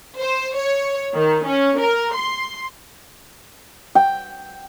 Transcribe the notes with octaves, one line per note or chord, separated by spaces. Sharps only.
C5
C#5
D#3
C#4
A#4
C6
G5